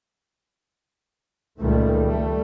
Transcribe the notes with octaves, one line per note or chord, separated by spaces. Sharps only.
C#2 A#2 D#3 G3 A3
G3 A3